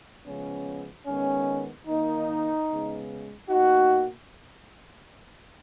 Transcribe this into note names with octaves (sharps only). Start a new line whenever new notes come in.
C#3 F3 G#3 B3 C#4
D#3 G#3 B3 C#4
D#3 A#3 D#4
C#3 G#3 B3
B2 A#3 D#4 F#4